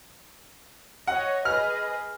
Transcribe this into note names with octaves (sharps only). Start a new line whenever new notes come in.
C#5 D#5 F#5
G#4 B4 D#5 F6